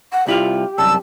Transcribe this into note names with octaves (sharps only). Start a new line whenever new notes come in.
F#5
C2 E4 F4 G4
C2 F#2 A5 E6